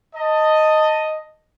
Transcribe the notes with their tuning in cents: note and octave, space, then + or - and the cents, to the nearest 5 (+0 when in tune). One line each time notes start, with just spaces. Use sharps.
D#5 +0 A5 +20